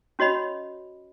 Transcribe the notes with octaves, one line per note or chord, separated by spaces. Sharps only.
C#4 F#4 C#5 D#5 B5